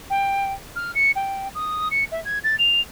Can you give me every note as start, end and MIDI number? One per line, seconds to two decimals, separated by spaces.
0.10 0.53 79
0.76 0.94 89
0.95 1.11 97
1.15 1.48 79
1.55 1.88 87
1.91 2.04 97
2.12 2.23 76
2.25 2.39 92
2.44 2.56 93
2.58 2.80 101